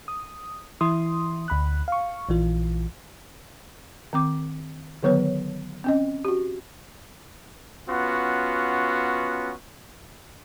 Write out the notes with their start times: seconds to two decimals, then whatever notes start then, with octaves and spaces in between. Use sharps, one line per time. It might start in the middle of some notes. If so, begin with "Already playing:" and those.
0.08 D#6
0.81 E3 E4 C6 D#6
1.48 D2 B5 F#6
1.88 F5 C#6
2.29 A#1 E3 F4
4.13 D#3 C4 D6
5.03 D3 D#3 F#3 B3 B4 C#5
5.84 C4 C#4 D#5
6.25 F#4 G4
7.88 B3 C#4 F4 F#4